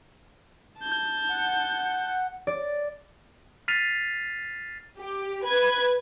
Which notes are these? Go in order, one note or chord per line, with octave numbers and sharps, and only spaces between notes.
A5 G6
F#5
D5
F6 A6 B6 C7 D#7 F7
G4
B4 G#6